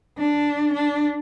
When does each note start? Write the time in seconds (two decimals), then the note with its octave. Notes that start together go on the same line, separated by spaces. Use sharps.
0.17 D4
0.74 D4